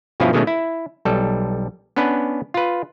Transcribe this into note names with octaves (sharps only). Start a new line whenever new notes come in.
G2 B2 F3 C#4 E4 F4
B2 D#3 G#3 A3 C#4
E4
B1 G3 A4
B3 C#4 D4 B4
F4 B4